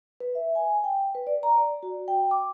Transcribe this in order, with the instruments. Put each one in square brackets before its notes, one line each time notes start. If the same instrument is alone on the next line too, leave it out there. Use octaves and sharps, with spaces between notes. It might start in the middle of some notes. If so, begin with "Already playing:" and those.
[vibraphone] B4
E5
G#5
G5
B4
D5
A#5
D5
F#4
G5
D6